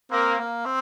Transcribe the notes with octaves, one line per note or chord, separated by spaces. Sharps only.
A#3 C4
A#3
C4